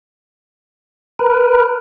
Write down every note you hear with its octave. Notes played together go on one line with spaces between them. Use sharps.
A#4 B4